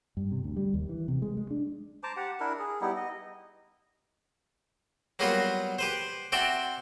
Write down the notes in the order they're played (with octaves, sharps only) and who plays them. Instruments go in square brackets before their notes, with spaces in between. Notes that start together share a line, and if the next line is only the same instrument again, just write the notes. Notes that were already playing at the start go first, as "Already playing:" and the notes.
[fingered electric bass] G2
C3
D2
G3
D#2
E3
C3
G#3
G#3
D4
[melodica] C5 A5 A#5 D6
G4 F#5
D4 E4 A#4
G#4
G3 B3 D#4 E4
D#5
[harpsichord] F#3 G3 A#3 B3 F4 F#4
G4 B4 C5
C4 F#4 D5 E5 G5 A5